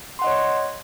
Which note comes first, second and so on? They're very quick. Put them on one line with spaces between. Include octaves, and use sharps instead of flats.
C6 F#5 D#5 C#5